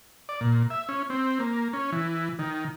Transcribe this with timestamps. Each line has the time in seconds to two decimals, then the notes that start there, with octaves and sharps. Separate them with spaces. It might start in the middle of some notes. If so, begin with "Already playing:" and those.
0.29 D5
0.41 A#2
0.70 E5
0.89 C#4
1.10 C4
1.40 A#3
1.73 C#4
1.92 E3
2.39 D#3